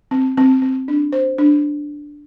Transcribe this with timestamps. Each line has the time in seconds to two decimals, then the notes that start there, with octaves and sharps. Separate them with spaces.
0.11 C4
0.37 C4
0.62 C4
0.88 D4
1.12 C5
1.38 D4